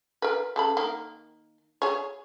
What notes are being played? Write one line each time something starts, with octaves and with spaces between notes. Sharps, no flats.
A#4 B4
C#3 A4 B5
D#3 A#3
G#4 C#5